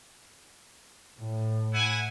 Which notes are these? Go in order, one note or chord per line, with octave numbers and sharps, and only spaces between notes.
A2
E4 F#5 G#5